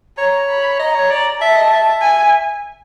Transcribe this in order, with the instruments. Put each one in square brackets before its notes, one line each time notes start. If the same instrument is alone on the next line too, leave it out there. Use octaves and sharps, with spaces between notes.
[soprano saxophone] C#5 [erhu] A#5
[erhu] B5
[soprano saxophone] D#5 [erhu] A#5
[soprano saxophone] C#5
D5
[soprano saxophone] E5 [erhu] A5
[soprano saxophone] D#5
E5
[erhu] G#5